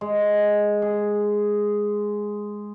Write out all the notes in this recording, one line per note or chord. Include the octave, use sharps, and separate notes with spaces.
G#3
G#4